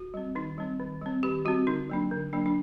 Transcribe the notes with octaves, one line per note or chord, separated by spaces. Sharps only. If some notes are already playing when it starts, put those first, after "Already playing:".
Already playing: F#4
G3 C4
D#3 D#4
G3 C4
D#3
G3 C4
D#3 G4
G3 C4 F#4
D3 D#4
F#3 A#3 D4
D3
F#3 A#3 D4
D4